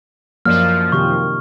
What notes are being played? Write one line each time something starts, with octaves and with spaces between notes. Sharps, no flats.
F#2 F3 A#3 D5 D#5 F6
C3 D#3 G4 C#6